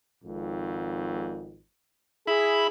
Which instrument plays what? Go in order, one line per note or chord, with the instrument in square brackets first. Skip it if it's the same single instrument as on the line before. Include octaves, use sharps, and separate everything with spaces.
[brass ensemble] G#1 F2 G#2
[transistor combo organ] E4 B5 [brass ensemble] G#4